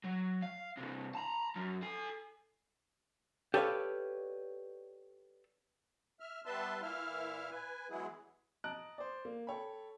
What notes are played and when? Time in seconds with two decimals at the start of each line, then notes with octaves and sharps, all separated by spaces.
0.05 F#3
0.43 F5
0.78 C3 E3
1.15 A5 A#5
1.56 F#2
1.83 A4 G#5
3.54 G4 A4 B4 C#5 D5 F5
6.20 E5 F6
6.45 G3 B3 B4 E5 A5 C6
6.82 A#2 E3 E4 E5 F5 F6
7.51 B4 G#5
7.90 E3 F#3 G#3 B3 E4 G#4
8.64 D#5 A5 A#5 F#6 D7
8.98 C5 D5
9.25 A#3
9.47 A4 C#5 G5 B5